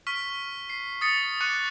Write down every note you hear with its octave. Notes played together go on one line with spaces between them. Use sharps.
C#6 F6 B6
C7
D#6 A6 C#7
C#6 D6 F#6 C#7